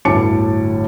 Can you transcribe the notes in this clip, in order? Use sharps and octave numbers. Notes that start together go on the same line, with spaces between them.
G1 D2 A2 A5 D6 C#7